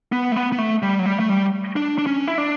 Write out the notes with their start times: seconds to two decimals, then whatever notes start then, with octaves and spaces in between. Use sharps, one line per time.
0.12 B3
0.32 A3
0.36 B3
0.52 B3
0.58 A3
0.83 G3
0.99 F#3
1.06 G3
1.19 A3
1.30 G3
1.76 D4
1.98 D4
2.07 C#4
2.28 E4
2.38 D4